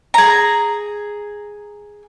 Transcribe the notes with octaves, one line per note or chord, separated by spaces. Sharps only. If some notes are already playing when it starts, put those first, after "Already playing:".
G#4 A#5